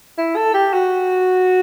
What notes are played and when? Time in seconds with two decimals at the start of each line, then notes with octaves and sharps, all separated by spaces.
0.18 E4
0.36 A4
0.54 G4
0.73 F#4